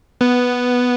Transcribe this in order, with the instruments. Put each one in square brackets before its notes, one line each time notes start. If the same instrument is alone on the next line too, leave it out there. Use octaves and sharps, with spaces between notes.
[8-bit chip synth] B3 B4